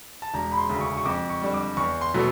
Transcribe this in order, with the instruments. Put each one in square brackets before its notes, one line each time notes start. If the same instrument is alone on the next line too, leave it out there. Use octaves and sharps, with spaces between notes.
[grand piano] A5
E1 A#5
B5
C6
D2 C#3
C#6
C#6
F2 D6
C#6
D3 G3
D6
E2 C#6
C6
B2 F#3 A3